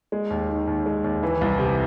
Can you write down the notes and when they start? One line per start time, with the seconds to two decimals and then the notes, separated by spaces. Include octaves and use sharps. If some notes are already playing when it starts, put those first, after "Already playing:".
0.12 G#3
0.30 D#2
0.49 D#3
0.67 D#2
0.86 G#3
1.04 D#2
1.23 E3
1.41 C2
1.59 C3